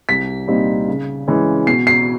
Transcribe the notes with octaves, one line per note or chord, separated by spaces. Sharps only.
C2 B6
A#2 G3 C4 D#4
C#3
E3 G#3 C#4
B2 C7
C7